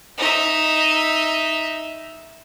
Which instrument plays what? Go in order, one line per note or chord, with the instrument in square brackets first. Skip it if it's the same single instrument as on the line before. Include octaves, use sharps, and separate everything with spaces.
[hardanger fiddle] D#4 E5